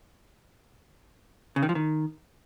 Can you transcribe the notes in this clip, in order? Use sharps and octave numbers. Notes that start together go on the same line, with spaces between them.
C#3
D#3
F3
D#3